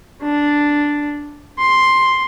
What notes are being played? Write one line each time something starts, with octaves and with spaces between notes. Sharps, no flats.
D4
C6